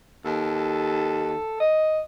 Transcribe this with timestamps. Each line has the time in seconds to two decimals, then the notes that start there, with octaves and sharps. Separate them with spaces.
0.25 D#2 A4
1.60 D#5